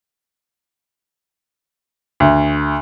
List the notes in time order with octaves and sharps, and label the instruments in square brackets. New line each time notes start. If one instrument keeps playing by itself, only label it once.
[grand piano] D2